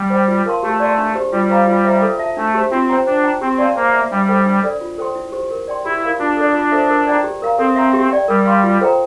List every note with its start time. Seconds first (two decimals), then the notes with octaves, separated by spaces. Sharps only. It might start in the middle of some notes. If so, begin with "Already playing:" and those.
Already playing: G3
0.10 C5 G5
0.28 F4
0.46 A#4 F5 A5 C6
0.63 A3 G4
0.80 D5 A5 C6
0.98 D4
1.15 G4 C5
1.32 G3 F4
1.50 C5 F5 A#5
1.68 F4
1.85 C5 E5 A#5
2.02 A4
2.19 E5 A5
2.37 A3 D4
2.54 G4 C5
2.71 C4 F4
2.90 C5 G5 A#5
3.07 D4 C5
3.23 G5 A#5
3.41 C4 G4
3.58 D5 F5 A5 C6
3.76 A#3 C5
3.93 E5 A#5
4.11 G3 D4
4.29 A4 C5 G5
4.46 D4
4.63 A4 D5
4.81 F4
4.98 A4 C5 G5 C6
5.16 E4
5.32 G4 C5
5.51 A#4
5.68 D5 G5 C6
5.85 E4 G4
6.03 A#4 F5
6.19 D4 F4
6.37 A4 D5
6.54 F4
6.71 A4 C5 E5
6.89 A#4
7.07 D5 G5 A#5
7.24 G4
7.42 A#4 F5 A#5
7.59 C4 A4
7.76 E5 A#5
7.93 G4
8.11 D5 G5
8.28 G3 A#4
8.45 F5 C6
8.63 F4
8.81 A4 C5 G5 A#5